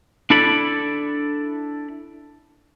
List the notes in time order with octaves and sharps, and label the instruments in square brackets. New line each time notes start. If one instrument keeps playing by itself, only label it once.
[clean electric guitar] D4 E4 A4 D5 B5